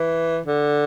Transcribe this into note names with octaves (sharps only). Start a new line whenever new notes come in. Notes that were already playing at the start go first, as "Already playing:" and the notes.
Already playing: E3
D3